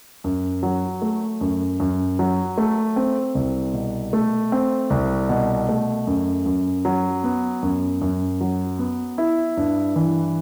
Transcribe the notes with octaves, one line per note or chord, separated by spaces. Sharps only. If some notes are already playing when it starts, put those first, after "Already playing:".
F#2
F#3
A3
F#2
F#2
F#3
A3
C4
C2
B2
A3
C4
C2
B2
A3
F#2
F#2
F#3
B3
F#2
F#2
F#3
B3
E4
G2
E3